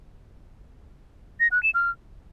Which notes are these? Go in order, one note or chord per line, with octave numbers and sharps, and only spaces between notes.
A#6
F#6
E7
F6